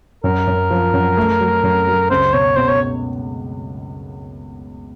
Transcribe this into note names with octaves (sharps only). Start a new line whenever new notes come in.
F#2 A#4
F#2
F3
F#2
A3
F#3
F#2
F#3
C#2 C5
B2 C#5
B2 C5
C#5